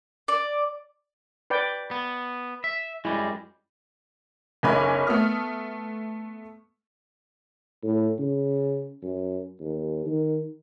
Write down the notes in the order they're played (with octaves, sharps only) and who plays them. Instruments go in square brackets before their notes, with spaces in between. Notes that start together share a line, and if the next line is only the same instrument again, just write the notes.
[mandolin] D5
[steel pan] B4 D5 G5
[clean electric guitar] B3
E5
[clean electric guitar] F#2 G3 G#3 [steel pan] E4
[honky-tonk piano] F#1 B1 C#4 G#5 B5 D6
A3 B3 D#6 F6
[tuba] A2
C#3
F#2
D#2
D#3